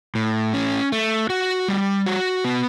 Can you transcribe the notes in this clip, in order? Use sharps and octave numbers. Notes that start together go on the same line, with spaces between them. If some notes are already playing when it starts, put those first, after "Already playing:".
A2
C#4
A3
F#4
G3
F#4
B3